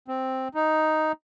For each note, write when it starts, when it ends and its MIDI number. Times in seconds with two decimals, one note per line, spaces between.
0.08 0.48 60
0.55 1.12 63